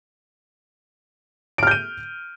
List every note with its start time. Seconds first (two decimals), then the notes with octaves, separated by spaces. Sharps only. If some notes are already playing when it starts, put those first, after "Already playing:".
1.58 D7
1.63 F6
1.67 G6
1.71 D#7